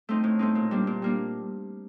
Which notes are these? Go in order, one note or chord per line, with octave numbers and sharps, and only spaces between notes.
A3 C4 D#4
A2
A3 C4 D#4
A#2
G3 A#3 D4
A#2
G3 A#3 D4